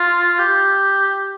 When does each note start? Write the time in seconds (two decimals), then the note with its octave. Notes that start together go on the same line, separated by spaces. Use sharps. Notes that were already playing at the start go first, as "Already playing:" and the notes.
Already playing: F4
0.39 G4